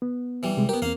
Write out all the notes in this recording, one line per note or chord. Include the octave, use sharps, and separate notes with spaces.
B3
E3 G3
C3 G#3
B3 G4 A#4
E2 A#3 C4 F5